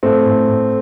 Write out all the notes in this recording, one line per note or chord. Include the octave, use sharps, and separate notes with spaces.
A2 A3 C4
A2
A2